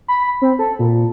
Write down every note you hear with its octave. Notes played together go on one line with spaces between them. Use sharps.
B5
C4
A4
A#2